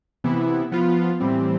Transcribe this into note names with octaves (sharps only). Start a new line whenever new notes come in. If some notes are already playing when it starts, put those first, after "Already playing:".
C3 E3 B3 E4
F3 B3 F4
A2 E3 G3 C4